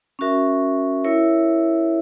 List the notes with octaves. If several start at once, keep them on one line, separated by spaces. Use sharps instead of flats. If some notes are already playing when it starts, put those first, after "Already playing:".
C#4 F#4 A#4 E5
E4 A#4 C#5 E5